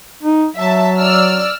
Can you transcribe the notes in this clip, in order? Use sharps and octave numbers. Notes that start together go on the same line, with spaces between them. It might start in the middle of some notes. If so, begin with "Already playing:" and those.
D#4
F#3 E5 A5
D5 E6 F6